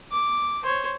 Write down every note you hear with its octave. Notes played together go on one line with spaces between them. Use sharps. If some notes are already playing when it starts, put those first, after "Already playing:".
D6
C5 C#5